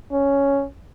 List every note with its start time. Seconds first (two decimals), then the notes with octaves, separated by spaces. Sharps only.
0.12 C#4